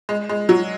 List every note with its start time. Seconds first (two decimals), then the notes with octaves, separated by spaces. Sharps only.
0.09 G#3
0.29 G#3
0.49 F#3